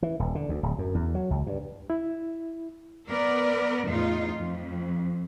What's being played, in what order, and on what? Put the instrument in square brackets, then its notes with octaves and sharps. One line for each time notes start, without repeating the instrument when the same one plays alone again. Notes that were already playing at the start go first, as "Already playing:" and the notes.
[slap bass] E3
D#1
D3
D2
D1
F#2
E2
F#3
C#2
G2
[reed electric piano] E4
[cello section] B3 A#4 D5
E2 A2 D#4 F4
F2